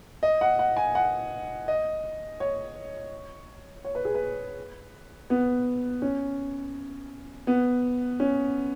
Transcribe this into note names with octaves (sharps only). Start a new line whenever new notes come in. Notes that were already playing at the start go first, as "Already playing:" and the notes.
D#5
F#5
F#5
G#5
F#5
D#5
C#5
C#5
B4
G#4
B4
B3
C#4
B3
C#4